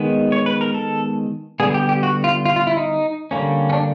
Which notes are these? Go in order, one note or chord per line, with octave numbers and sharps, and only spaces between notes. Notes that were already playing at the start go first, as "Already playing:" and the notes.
Already playing: D#3 G#3 B3
C#5
B4
A#4
A4
D3 G3 B3 G#4
G4
G4
F#4
F4
F4
F4
E4
D#4
D3 G3 A#3 C#4
C#4
D4